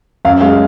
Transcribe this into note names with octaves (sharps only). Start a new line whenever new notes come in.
F#2 F5
G#3 F5